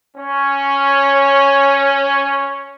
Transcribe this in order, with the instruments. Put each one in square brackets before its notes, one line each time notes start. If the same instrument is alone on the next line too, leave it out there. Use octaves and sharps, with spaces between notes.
[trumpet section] C#4 C#5